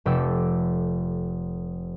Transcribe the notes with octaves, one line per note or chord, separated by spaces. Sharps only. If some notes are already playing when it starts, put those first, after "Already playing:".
F1 G4 A4 E6